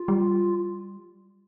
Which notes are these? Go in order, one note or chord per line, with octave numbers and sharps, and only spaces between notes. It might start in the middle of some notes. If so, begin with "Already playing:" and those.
Already playing: F4
G3